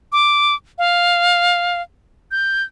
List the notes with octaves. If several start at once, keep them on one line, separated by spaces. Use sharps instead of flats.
D6
F5
G6